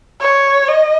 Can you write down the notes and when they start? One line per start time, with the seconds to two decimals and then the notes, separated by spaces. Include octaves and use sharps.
0.21 C#5
0.68 D#5